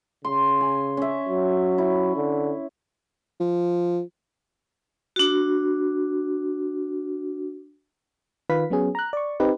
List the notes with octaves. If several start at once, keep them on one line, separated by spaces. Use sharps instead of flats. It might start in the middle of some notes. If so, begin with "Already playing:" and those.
C#3 C6
G#5
C#4 E5
F#3
E4
D3
F3
D4 F#4
D#3 F4 B4 F5 B6
F#3 B3 C#4 G#4
A#5 F#6
D5 C#6
C4 D#4 G4 B4